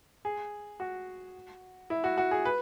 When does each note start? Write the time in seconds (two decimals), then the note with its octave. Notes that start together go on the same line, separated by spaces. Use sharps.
0.25 G#4
0.80 F#4
1.90 E4
2.04 F#4
2.18 F#4
2.31 G#4
2.45 B4